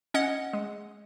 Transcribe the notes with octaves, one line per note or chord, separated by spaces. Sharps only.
C#4 D#5 F#5
G#3